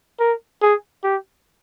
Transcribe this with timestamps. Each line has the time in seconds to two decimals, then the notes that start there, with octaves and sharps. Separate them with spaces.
0.20 A#4
0.62 G#4
1.03 G4